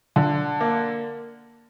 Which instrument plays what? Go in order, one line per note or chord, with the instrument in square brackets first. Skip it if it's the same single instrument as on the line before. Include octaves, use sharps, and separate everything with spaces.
[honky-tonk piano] D3
A#3